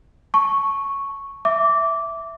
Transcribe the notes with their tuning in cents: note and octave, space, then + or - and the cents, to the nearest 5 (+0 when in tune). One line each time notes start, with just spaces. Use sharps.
A5 +0 C#6 +0
E5 +0 D6 -15